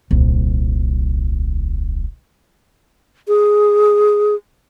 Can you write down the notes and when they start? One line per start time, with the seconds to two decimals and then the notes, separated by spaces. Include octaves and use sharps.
0.11 D#1 C2
3.28 G#4